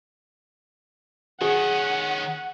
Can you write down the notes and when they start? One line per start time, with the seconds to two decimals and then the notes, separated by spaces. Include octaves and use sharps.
1.41 D#3 C#4 G#4 F#5